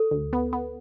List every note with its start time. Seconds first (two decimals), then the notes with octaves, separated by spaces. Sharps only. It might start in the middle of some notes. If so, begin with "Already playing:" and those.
Already playing: A4
0.11 D2
0.33 B3
0.53 B3